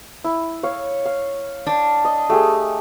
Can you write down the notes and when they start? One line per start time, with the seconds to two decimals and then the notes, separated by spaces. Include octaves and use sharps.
0.24 E4
0.63 C#5 F5
1.06 F5
1.67 D4
2.05 D#5
2.30 A3 G4 G#4